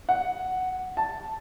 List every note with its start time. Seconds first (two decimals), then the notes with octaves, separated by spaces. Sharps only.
0.09 F#5
0.97 A5